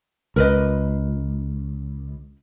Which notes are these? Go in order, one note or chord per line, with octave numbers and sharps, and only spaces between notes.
C#2 A#4 B4 D#5